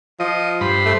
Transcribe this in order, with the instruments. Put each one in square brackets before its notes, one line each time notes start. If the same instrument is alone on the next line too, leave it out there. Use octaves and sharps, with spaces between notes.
[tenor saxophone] F3 [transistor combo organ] D#5
[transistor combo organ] G2 C5 B5
[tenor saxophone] A3